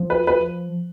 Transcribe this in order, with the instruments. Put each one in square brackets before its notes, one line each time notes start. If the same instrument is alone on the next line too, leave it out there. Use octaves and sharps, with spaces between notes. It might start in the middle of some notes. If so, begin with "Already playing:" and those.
Already playing: [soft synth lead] F3
[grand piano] B4
B4